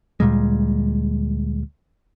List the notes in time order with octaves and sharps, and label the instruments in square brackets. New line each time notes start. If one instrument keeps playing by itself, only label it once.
[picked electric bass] D2 A#2 G3 G#3